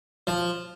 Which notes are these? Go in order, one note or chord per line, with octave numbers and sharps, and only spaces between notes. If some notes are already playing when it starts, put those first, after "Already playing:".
F3